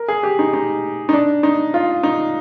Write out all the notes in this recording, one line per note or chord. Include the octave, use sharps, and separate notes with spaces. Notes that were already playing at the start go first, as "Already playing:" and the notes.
Already playing: A#4
G#4
G4
D#4
D#4
D#4
D4
D#4
F4
D#4